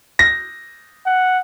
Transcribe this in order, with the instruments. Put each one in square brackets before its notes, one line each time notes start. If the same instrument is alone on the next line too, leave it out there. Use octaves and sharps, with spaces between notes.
[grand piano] A#6
[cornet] F#5